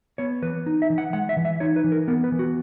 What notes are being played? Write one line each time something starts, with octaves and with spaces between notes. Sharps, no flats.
B3 C#5
E3 B4
D#4
E5
E3
F#5
G#3 F#5
E5
E3
E5
D#4 C#5
B4
E3
A#4
B3 A#4
B4
E3
F#4